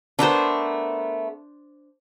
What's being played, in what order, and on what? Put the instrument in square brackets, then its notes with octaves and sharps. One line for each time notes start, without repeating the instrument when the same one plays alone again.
[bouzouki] A3 B3 A#4 [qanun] D4 C5